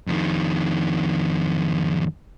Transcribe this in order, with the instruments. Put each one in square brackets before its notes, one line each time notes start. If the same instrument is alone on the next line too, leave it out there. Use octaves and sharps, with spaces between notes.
[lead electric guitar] F2 D#3